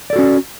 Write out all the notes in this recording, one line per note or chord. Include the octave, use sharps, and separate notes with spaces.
C#4 F#4 A4 D5